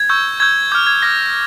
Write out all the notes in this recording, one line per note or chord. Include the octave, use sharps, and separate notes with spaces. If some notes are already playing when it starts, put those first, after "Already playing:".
Already playing: G#6
C#6 E6 G6
C#6 E6 G6 G#6
D6 F6 G6
G#6
D6 F6 A#6